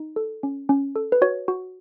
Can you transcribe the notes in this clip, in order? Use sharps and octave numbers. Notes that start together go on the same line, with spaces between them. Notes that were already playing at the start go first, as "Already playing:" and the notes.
Already playing: D#4
A4
C#4
C#4
A4
B4
F#4 C#5
F#4